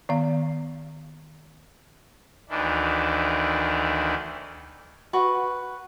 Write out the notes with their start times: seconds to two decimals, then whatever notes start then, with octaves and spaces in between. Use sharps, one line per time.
0.09 D#3 B3 F5
2.49 D2 D#3 E3 D4
5.13 F#4 B4 F#5 C#6